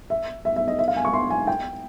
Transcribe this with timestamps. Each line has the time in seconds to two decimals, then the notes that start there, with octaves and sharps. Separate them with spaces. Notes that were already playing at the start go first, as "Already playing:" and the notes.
0.10 E5
0.45 E5
0.56 E5
0.68 D#5
0.79 E5
0.88 F5
0.97 G#5
1.05 C#6
1.13 C6
1.30 G#5
1.47 G5